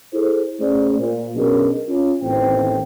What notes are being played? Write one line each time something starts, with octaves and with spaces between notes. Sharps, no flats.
E4 G#4 A4 C5
A3 C#4 G#4 C5 D5
A#2
B1 B2 C#4 D4 G#4 A#4
C#4 F4
A1 D#2 A2 C4 G5